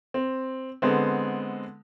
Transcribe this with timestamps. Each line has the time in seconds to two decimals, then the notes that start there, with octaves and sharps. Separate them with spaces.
0.14 C4
0.82 D3 G#3 B3 C4